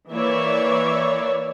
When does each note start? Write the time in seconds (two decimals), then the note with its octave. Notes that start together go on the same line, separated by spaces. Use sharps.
0.11 E3 A#3 C#5 D5 E5